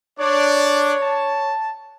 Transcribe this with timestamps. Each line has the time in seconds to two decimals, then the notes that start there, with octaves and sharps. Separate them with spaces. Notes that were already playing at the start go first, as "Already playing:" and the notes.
0.20 D4 C#5 D5
1.03 A5